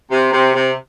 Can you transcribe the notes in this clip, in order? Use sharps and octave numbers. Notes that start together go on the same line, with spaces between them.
C3
C3
C3